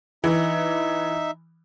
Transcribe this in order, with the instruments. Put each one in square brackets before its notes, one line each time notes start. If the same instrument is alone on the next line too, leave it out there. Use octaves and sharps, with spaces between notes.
[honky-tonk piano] E3 [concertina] D#4 E5